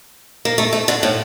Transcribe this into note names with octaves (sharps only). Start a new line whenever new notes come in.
A#3
A3
A3
D3
A2